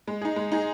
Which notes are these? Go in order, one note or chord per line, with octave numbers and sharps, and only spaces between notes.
G#3
D#4 G#4
G#3
D#4 G#4